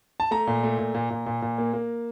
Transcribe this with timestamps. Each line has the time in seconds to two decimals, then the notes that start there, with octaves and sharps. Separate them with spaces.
0.20 A5
0.31 A3 A#5
0.47 A#2
0.63 A3
0.79 A#2
0.95 A#2
1.10 A#2
1.26 A#2
1.42 A#2
1.58 A#3
1.73 A#3